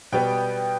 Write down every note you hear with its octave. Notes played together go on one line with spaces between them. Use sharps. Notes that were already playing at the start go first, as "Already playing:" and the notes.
B2 G3 B3 G5